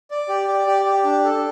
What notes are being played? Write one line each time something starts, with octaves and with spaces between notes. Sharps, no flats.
D5
G4
D5
G4
G4
D4
A4